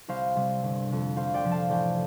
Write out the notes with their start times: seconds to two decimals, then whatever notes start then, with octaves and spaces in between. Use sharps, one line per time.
0.08 C2 C5 F5
0.36 C3 G3 C4
0.63 G1
0.90 F2 C3
1.16 D2 C5 F5
1.34 D5 G5
1.44 C3 F3
1.52 F5 A5
1.69 A1 D5 G5